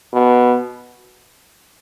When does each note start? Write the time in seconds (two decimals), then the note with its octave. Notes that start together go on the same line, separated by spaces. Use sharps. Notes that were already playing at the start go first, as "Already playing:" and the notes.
0.13 B2